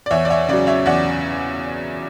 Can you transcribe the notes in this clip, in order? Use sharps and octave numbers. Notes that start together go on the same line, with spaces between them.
D5
E2 C#5 E5
D5
C#5 E5
C#3 F#3 D5
C#5 E5
E2 D5 F#5